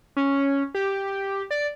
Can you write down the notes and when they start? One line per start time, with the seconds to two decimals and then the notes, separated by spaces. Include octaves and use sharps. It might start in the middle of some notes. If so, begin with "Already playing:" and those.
0.17 C#4
0.75 G4
1.51 D5